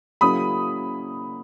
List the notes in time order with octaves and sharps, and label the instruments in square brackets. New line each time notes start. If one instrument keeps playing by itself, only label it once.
[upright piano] C#3 F#3 A#3 C#4 E4 [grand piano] B5 D#6